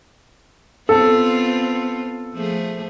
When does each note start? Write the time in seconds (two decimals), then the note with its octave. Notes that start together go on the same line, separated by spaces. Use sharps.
0.89 B3 C4 F4 A4
2.35 F3 A3 G#4